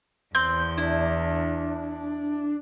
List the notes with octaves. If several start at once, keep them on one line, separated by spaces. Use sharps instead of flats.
E2 C4 G6
D4 E4